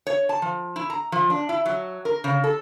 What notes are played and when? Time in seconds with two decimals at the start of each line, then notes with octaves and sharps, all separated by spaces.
0.07 C#5
0.29 A5
0.42 F3
0.76 E4
0.90 A#5
1.12 F3
1.30 D4
1.49 E4
1.66 F#3
2.05 A#4
2.24 C#3
2.44 A4